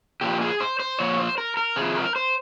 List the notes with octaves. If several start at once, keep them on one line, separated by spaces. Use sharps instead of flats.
A#2 F3 G4
G#4
C5
C5
A#2 F3 C#5
C5
A#4
A#4
C3 F3 G#4
A#4
C5